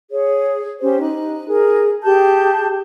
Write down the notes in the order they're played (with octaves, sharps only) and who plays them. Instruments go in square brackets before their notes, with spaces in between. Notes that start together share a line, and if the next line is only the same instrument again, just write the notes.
[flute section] G#4 C#5
C#4 G4 C5
D#4 F#6
G#4 A#4
G4 G#4 A5 G6